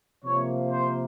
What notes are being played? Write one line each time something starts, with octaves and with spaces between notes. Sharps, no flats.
C3 F3 A#3 C#5
C5